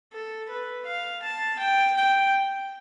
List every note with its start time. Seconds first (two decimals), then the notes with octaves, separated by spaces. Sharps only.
0.13 A4
0.49 B4
0.86 F5
1.23 A5
1.59 G5
1.96 G5